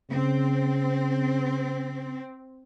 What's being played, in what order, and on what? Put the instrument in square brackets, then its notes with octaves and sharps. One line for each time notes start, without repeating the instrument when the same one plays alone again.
[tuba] C#3 [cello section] C4